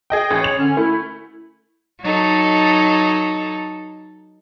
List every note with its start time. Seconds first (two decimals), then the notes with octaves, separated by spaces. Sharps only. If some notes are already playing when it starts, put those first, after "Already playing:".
0.10 G#4 D#5 G5
0.30 A1 G#4 C#5
0.44 F7
0.58 D3 C#4
0.77 A3 E4
2.02 F#3 D#4 A4